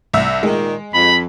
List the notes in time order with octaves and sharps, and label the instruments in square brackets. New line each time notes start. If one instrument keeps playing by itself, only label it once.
[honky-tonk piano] C2 E5 E6
[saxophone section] A#2 D#3 [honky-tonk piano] G#3
[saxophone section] F2 [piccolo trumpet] B5